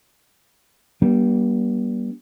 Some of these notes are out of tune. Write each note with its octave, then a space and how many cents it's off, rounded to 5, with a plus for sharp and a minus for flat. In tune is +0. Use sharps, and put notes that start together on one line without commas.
G3 -20 A#3 +45 D4 -25